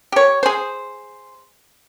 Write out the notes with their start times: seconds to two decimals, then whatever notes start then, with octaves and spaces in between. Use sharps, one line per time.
0.12 G4 C#5
0.43 G#4 C5